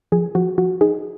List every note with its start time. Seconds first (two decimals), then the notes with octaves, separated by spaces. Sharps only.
0.12 F3 G#4
0.35 F3 F#4
0.58 F3 F#4
0.81 D#4 G#4